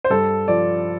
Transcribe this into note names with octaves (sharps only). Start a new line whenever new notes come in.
C5
G2 A4
F3 D5